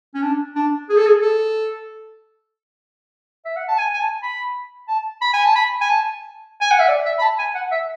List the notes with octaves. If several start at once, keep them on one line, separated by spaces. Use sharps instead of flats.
C#4
D4
D4
G#4
A4
G#4
A4
E5
F#5
A5
G#5
G#5
A5
B5
A5
B5
G#5
A5
B5
G#5
A5
G#5
F#5
E5
D5
E5
B5
A5
G#5
F#5
E5